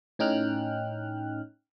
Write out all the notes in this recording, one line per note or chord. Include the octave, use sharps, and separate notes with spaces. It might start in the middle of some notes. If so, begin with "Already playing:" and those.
A2 C#4 D#4 G5 F6 F#6